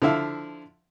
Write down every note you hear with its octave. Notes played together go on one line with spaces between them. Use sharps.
D3 F3 E4 E5 F5